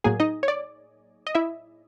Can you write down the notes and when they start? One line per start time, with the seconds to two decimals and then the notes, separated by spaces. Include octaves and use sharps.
0.04 A2 F#3 A#3 G#4 G#5
0.20 D#4 D#5
0.43 C#5
0.48 D5
1.27 D#5
1.35 E4 E5